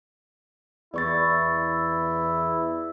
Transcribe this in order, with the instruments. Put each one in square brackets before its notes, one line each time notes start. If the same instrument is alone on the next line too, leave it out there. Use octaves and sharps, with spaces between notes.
[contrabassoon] E2 [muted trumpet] E4 [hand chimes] D5 C#6 A6